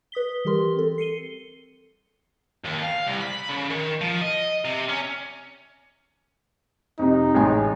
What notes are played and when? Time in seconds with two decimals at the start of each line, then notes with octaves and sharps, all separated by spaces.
0.12 B4 D#6 B6 G7
0.45 E3 G3 G4 A#4 C6
0.76 C4 A4
0.98 C7 C#7 D#7 G7
2.64 D#2
2.82 F5
3.06 C2
3.21 B5
3.49 C#3
3.70 D#3
4.01 F3
4.21 D#5
4.65 C3
4.89 C#4
6.99 F2 C3 D#4
7.35 A1 G#3 G#5